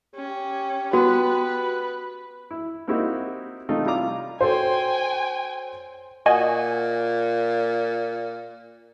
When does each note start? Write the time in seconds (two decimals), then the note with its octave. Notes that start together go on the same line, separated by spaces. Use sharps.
0.15 C#4 G4
0.93 B3 F#4 B4
2.51 E4
2.87 A#3 C4 D#4 E4 F#4 G4
3.69 C3 A3 D#4 F4
3.86 G3 E4 F4 D5 A#5 D6
4.41 F#4 A4 C5 C#5 G5 G#5
6.26 A#2 F#4 D#5 G#5